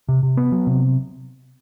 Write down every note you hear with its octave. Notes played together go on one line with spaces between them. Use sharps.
C3
C3
B3
F#3
C3